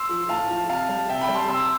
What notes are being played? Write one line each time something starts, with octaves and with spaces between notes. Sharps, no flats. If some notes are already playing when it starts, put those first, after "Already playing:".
Already playing: C6 E6
F3
A2 F5 A5
F3
C3 F5 A5
G3
C3 E5 G5
G5 B5
G3
A5 C6
C3 C6 E6